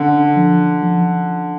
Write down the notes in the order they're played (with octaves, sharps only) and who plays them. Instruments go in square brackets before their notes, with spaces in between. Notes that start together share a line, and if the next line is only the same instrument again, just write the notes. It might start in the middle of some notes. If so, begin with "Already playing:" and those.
Already playing: [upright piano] D3 [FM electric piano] C#4
[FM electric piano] F3
F3